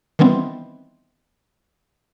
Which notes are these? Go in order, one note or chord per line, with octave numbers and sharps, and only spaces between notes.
D#3 E3 G3 B3 C4